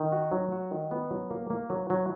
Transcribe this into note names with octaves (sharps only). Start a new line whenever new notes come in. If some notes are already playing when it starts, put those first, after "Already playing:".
Already playing: D#3
F#4
F#3
F#4
D#3
B3
F#3
A#3
A#3
F#3
F#3